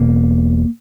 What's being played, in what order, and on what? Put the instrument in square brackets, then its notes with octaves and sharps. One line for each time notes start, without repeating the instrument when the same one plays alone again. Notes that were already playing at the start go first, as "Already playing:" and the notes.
Already playing: [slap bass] E1 E2 B2 A#3